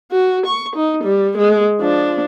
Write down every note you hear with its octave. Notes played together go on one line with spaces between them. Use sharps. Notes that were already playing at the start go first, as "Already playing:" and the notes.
F#4
C#6
D#4
G3
G#3
F3 D4